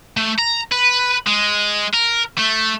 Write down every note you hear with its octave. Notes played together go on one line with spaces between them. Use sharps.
A3
A#5
B4
G#3
A#4
A3